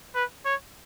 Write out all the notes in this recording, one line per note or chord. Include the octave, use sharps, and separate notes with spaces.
B4
C#5